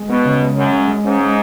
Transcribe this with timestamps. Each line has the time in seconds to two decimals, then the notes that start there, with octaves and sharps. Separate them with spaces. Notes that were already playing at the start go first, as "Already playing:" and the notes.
Already playing: G#3
0.09 B2 B3
0.25 C#3
0.41 G#3
0.56 F#2 C#4
0.72 G#3
0.88 G#3
1.04 G#2 C#4
1.20 G#3